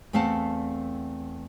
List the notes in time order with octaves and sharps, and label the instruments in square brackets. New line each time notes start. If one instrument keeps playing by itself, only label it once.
[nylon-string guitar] E2 A3 C4 F5 F#5 A5